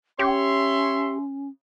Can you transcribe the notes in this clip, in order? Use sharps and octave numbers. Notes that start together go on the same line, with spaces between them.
C#4 G4 C#5 E5 C6